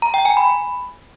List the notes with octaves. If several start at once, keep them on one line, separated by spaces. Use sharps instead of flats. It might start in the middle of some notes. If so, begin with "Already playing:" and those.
A#5
G5
G#5
B5